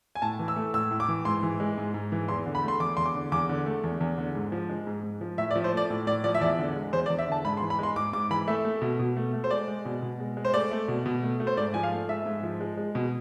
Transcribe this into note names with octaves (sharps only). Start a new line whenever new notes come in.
G#5
A2 A5
E3
E6
A3
A2 E6
A2
D6
E3
G#2 C6
E3
G#3
G#2
G#2
E3
E2 C6
D3
B5
A3
C6
E2 D6
E2 C6
D6
D3
E2 D6
D3
A3
E2
E2
D3
G#2
F3
G#3
G#2
G#2
F3
A2 E5
D5
F3
C5
A3 D5
A2
A2 D5
F3 D5
E5
E2 D5
D3
G#3
E2 C5
D5
E2
E5
D3 A5
G#2 B5
C6
E3
B5
G#3 C6
G#2 D6
G#2 D6
E3 B5
A3 E5
A3
B2
B2
A3
A3
C5
G#3 D5
G#3
B2
B2
G#3
G#3
C5
A3 D5
A3
B2
B2
A3
A3
C5
G#2 D5
F3 G#5
F5
A3
G#2 E5
G#2
F3
G#3
G#3
B2